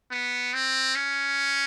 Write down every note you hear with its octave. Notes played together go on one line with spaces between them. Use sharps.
B3
C4
C#4